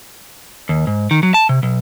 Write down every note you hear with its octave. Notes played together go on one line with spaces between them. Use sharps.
D#2
G#2
D#3
F#3
A5
C3
B1